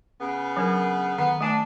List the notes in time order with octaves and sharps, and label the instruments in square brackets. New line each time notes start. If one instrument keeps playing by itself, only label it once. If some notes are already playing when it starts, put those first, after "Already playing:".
[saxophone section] C#3 B3
[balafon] F#3 D4 A#4
[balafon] D#3 F#5 [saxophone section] B3
[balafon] A3 G#5 [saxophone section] D4